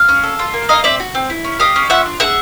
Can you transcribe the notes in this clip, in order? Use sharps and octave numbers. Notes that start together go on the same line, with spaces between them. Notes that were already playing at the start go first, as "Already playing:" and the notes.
Already playing: F5
C#4
A4
F4
A#3
D#4 D#5 F5
C4 D5 E5
F#4
C4
E4
C#4
G4 D#5 F5
C#4
F4 E5 F#5
D4
G#4 E5 F#5